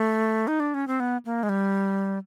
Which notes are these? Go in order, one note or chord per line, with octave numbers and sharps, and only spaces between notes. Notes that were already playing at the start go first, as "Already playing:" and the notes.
Already playing: A3
D#4
D4
C#4
C4
B3
A#3
G#3
G3